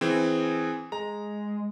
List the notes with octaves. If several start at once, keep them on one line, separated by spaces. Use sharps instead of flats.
E3 C4 G#4
G#3 A#5